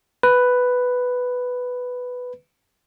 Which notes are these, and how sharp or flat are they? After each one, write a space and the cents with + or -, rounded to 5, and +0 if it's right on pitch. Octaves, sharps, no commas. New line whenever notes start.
B4 +5